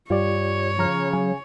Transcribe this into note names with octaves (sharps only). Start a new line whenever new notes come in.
G2 F4 G4 C#5 D5
C#3 F3 A#5 F6
F#3 G#5